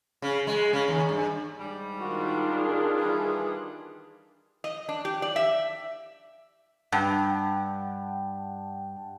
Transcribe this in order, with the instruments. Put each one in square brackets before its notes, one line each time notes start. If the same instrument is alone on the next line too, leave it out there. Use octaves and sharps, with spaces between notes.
[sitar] C#3
G#3
C#3
D#2
G2
[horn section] G#2 G3
[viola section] D#3 A#4 [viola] D4 F4 [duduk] F#4
[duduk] G#4
[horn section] E3 G3
[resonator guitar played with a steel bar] D#5
D4
G4
D5
E5
[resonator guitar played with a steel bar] G2 [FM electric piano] F#5 G5 A5